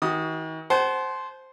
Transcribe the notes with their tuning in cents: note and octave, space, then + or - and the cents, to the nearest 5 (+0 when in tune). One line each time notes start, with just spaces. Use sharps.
D#3 +45 F#4 +20 D#6 +0
C5 +0 F#5 +35 A5 -40